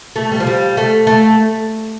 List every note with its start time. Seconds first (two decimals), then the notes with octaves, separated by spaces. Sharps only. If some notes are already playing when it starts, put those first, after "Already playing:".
0.16 A3
0.32 G3
0.40 F3
0.47 G3
0.77 A3
1.07 A3